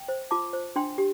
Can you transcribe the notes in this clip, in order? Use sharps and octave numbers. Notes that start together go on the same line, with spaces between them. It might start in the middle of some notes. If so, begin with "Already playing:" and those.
Already playing: G5
C5
F4 A5 D6
C5
D4 G5 C6
G4